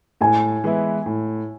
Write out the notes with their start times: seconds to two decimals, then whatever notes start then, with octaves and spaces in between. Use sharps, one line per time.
0.21 A2 G#5
0.64 E3 G#3 B3 E4
1.06 A2